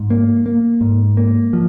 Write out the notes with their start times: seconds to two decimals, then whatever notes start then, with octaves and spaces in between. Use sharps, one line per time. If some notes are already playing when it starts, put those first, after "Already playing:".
Already playing: G#2
0.10 A#3
0.46 A#3
0.81 G#2
1.17 A#3
1.53 F3